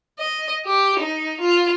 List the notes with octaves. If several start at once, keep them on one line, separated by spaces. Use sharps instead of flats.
D#5
G4
D#4
F4